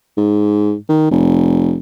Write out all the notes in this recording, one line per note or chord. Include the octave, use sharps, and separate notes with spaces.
G#2
D#3
F1